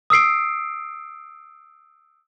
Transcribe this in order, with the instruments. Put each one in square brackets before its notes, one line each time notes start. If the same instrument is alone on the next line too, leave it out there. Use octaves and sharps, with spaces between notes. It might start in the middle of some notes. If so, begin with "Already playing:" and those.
[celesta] D#6 E6 C7 D7